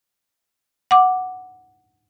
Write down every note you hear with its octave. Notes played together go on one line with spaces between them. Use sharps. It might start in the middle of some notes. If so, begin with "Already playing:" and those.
F#5 D6